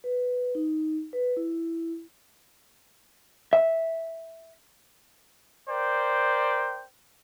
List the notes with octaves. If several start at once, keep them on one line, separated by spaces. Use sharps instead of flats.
B4
D#4
B4
E4
E5
A#4 C5 D5 G5